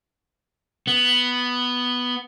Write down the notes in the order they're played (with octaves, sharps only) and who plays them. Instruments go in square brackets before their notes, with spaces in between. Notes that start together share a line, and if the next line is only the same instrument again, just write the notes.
[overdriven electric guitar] B3